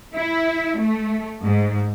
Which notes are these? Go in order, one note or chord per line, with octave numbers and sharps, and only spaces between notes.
E4
A3
G#2